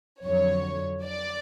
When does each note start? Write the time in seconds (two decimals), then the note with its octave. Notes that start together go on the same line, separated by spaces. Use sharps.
0.24 F2 D3 F#3 C#5
1.05 D5